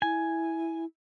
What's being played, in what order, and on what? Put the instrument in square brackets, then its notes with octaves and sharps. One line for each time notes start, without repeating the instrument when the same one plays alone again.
[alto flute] E4 [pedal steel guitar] G#5